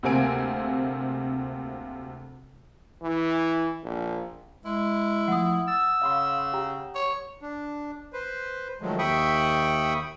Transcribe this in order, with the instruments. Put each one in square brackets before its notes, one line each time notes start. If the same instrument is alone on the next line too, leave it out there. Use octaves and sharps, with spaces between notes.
[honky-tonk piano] D2 C3 A#3 C4 G#5 D7
[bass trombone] E3
A#1
[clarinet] G#3 [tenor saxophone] E4
[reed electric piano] F3 A3 [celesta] F#5 D#6
[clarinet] E6 [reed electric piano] A6
[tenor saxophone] C#3 [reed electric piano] F5 B5 C6
[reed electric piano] G4 G5 A#5
[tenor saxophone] C#5
[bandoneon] D4
B4 C5
D#3 F3 F#3 G#3 A3
D#2 E5 G5 B5 C#6 D#6